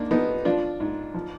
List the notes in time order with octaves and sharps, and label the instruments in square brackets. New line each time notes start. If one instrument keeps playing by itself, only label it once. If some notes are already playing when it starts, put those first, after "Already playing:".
Already playing: [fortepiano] G#2 A#3 D4
F3 B3 D#4
F3 D4 F4
G#2
F3